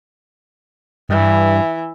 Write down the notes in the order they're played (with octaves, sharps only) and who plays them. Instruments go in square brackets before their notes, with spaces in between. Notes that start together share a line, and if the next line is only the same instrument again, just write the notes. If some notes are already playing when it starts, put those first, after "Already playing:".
[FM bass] G2 [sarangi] E3